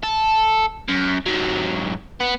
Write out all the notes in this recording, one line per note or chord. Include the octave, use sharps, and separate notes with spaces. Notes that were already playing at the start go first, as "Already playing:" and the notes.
A4
F#2
G#2 F#3
B3